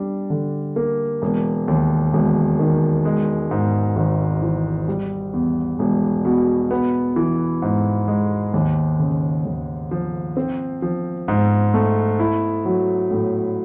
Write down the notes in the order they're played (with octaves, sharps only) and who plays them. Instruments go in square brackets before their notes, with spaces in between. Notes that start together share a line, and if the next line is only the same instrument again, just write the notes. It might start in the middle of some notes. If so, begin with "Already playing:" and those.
Already playing: [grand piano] G3 D4
D3
A#3
E1
D#2
E1
D#3
G#3
G#2
G#1
E3
G3
E2
E1
B2
B3
E3
G#2
G#3
D#2
C#3
D#2
F3
C4
F3
G#2
A3
E4
F#3
A2